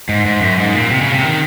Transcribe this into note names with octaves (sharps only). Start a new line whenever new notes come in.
G#2
G#2
F#2
G#2
A#2
C3
C#3
C3
D#3